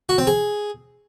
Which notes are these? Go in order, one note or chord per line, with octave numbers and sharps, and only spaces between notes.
F#4
C4
G#4